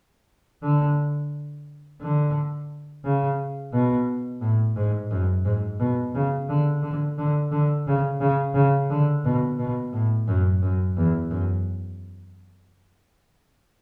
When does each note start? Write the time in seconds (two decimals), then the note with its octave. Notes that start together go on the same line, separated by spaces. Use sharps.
0.63 D3
2.01 D3
3.04 C#3
3.73 B2
4.41 A2
4.76 G#2
5.11 F#2
5.45 G#2
5.80 B2
6.15 C#3
6.49 D3
6.83 D3
7.18 D3
7.52 D3
7.87 C#3
8.21 C#3
8.55 C#3
8.90 D3
9.25 B2
9.59 B2
9.93 A2
10.27 F#2
10.62 F#2
10.97 E2
11.31 F#2